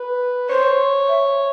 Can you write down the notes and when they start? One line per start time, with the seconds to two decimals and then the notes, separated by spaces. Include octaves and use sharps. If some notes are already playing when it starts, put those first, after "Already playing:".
Already playing: B4
0.49 C5 C#5
1.08 E5